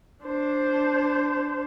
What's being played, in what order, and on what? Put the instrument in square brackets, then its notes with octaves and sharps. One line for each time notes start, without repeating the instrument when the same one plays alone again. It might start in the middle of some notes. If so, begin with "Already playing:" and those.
[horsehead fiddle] D4 C5